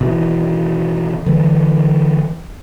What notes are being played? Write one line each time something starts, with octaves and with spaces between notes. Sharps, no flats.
B2 D#3 E3
D3 E3 G3